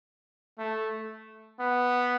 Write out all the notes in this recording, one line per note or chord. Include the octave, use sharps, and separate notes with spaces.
A3
B3